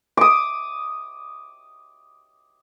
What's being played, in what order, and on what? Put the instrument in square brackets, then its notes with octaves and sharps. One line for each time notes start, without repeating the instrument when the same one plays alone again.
[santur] D6 D#6